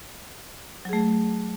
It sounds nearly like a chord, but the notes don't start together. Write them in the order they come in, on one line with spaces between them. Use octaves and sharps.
F#3 G#4 A3